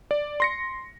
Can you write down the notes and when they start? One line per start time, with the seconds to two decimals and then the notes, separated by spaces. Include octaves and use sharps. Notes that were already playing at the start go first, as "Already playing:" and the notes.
0.11 D5
0.40 C6 A#6 C#7